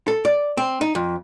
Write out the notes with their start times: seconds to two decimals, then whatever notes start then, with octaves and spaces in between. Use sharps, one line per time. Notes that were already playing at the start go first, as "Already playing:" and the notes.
0.08 A4
0.25 D5
0.57 C4
0.81 D#4
0.95 F2